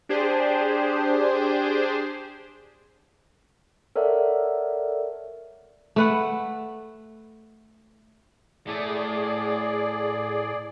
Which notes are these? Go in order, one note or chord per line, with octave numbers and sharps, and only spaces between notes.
D4 G4 G#4 C5
A4 A#4 C#5 D5 E5 F#5
A3 B4 F#5
A2 A3 G#4 D5